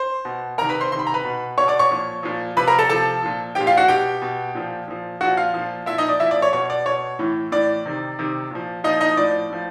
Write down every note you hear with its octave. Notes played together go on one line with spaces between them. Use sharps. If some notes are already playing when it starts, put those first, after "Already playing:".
Already playing: C5 C6
B2
C3 D#3 A#4 A#5
B4 B5
C5 C6
C3 D#3 C6
B5
A#5
B4 B5
B2
B2 C#5 C#6
D5 D6
C#5 C#6
A#2 F3
A#2 F3
C3 F3 B4 B5
A#4 A#5
A4 A5
C3 F3 A4 A5
A#2 F3
F3 G4 G5
A#2
F4 F5
F#4 F#5
B2 G4 G5
B2
A#2 F3
A#2 F3
A#2 F3 F#4 F#5
F4 F5
A#2 F3
A#2 F3 E4 E5
D#4 D#5
D5
A#2 F3 E4 E5
D5
C#5
B2 C#5
D5
B2 C#5
A2 E3
A2 E3 D5
C3 D#3
C3 D#3
A#2 F3
A#2 F3 D#4 D#5
D#4 D#5
A2 F3 D5
A2 F3